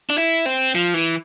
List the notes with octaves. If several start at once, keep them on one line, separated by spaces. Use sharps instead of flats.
D4
E4
C4
F3
E3